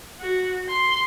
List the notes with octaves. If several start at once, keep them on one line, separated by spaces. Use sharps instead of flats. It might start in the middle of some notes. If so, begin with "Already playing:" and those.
F#4
C6